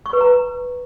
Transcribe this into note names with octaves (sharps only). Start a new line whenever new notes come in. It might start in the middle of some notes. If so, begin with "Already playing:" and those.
C#6
B4
A#5